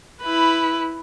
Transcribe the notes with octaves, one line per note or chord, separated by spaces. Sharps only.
E4 B4